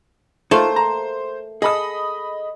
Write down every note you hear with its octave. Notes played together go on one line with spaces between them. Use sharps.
A3 A#3 D#4 F4 C5
A#5
G#4 A4 D#5 B5 D#6